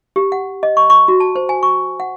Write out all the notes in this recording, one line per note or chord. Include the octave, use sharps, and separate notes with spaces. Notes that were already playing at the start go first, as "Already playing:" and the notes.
G4
F#5
D#5
C#6
C#6
F#4
A5
C5
G#5
C#6
F#5